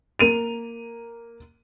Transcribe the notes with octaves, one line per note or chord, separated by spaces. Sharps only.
A#3 D#7 F7